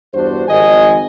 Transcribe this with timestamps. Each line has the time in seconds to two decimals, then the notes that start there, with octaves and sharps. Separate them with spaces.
0.14 E2 G2 D4 F#4 C5
0.47 G#1 F2 D#5 G#5